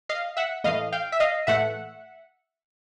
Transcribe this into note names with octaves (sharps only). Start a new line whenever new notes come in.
D#5 F5
E5 F#5
A2 E3 A3 D#5 F5
F5 G5
E5
D#5 F5
A2 E3 A3 E5 F#5